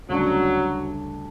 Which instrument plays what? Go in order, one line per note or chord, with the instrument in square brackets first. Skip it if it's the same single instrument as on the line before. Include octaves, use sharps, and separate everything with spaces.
[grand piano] D2 C#3 G3 D4 [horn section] F#3